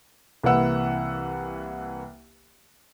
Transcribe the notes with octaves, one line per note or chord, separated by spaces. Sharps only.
C2 E3 A#3 B4 F#5 E6